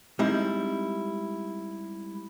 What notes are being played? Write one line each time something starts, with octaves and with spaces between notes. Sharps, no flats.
G3 G#3 C4 D#4 E4